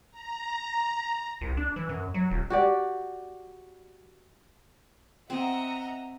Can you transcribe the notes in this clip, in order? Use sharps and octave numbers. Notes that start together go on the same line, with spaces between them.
A#5
C2
D4
E3
F#2
F#3
D#1
F#4 G4 D5
C4 D#5 E5 F#5 A#5